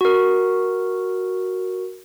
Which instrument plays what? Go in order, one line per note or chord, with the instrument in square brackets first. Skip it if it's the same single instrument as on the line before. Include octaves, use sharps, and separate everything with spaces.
[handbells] F#4 A#4